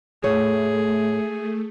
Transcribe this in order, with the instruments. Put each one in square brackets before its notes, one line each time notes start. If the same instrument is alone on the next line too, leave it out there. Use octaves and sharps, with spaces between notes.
[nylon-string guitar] A2 C#5 [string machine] A3 [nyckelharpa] G#4